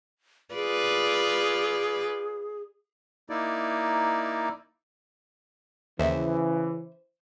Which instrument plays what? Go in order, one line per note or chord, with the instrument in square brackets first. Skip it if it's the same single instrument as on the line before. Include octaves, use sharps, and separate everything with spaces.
[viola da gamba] F4 B4 D5 [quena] G#4
[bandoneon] A#3 D#4 E4 D5
[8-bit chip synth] D#2 [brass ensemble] C#3 E3 [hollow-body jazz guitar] C5 E5